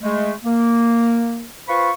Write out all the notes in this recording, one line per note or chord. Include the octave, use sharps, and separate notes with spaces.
G#3 A3
A#3
F4 B4 C5 B5 C#6